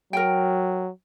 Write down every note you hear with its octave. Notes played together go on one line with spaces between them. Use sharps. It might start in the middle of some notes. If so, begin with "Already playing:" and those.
F#3 A#4 G5